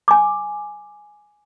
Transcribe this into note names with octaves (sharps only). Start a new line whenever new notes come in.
G#5 D6